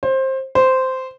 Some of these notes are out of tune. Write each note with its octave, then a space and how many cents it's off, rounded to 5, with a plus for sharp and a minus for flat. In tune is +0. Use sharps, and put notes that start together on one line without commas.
C5 +20
C5 -10